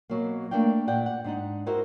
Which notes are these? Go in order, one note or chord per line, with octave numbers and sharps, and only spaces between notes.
B2 F#3 A#3
A3 A#3 D4 D5 F5 G5
A#2 D5 F#5 G5
F#5
G#2 D4 D#4 F#5
D#4 E4 F#4 A#4 C5